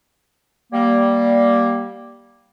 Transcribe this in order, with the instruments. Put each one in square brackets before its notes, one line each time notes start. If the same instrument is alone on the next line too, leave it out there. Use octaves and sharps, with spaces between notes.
[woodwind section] G3 A#3